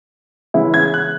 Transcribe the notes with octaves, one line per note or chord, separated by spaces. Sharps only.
C#3 E3 G#3 B3 E4
G#6
F#6